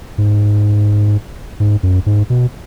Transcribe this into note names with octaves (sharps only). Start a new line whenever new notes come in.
G#2
G#2
F#2
G#2
B2